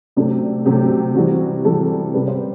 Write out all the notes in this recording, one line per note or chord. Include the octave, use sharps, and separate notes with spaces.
C3 F#3 A3 D4
C3 F#3 A3 G4
C3 E3 G3 F#4
C3 E3 G3 A4
C3 G3 B4
C5